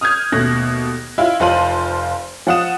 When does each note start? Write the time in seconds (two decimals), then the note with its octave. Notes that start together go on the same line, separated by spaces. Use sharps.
0.01 D#6 F6 G6 G#6
0.32 D#2 B2 A3 F#6 A#6
1.18 E4 F4
1.40 F1 F4 C5 A5 D#7 F#7
2.47 F3 F5 F#5 D#6 E7